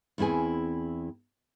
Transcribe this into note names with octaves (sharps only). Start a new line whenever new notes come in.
E2 C4 E4 G#4 G#5